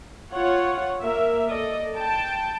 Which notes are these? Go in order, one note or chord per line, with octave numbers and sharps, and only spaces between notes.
F4 C#5 F#5
A#3 A#4 E5
A4 D5 D#5
G5 A5